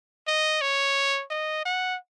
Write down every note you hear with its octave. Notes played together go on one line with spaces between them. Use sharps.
D#5
C#5
D#5
F#5